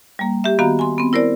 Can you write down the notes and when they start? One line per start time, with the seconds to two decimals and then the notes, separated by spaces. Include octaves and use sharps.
0.19 G3 A#3
0.44 G4 E5
0.59 D#3 B3 F#4 F5 A#5
0.79 G#5 C6
0.98 B3 C4
1.13 E4 A#4 C5 D5